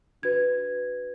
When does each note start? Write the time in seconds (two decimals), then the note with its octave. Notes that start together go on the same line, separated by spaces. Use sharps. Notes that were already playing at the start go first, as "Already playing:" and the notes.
0.22 D4 F#4 B4 G#6